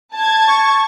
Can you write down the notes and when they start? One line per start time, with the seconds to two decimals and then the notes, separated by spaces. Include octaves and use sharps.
0.14 A5 G#6
0.47 C#6